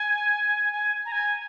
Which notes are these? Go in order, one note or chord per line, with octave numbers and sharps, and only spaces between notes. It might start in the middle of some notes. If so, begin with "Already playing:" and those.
Already playing: G#5
G#5
A#5
G#5